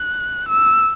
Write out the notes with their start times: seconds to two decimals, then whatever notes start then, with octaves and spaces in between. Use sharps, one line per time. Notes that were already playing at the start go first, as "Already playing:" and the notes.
Already playing: F#6
0.49 E6